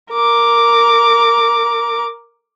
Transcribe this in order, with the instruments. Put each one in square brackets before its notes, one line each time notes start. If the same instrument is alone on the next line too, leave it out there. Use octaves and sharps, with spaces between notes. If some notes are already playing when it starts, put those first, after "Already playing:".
[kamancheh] A#4 D6